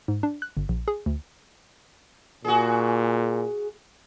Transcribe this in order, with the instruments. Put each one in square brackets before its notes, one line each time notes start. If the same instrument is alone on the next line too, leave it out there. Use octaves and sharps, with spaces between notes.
[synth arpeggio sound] G#2
D4
F#6
G1
A#1
G#4
D2
[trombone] A#2 [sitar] F#4 G#4